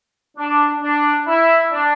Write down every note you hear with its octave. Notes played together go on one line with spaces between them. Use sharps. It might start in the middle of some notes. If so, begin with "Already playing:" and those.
D4
D4
E4
D4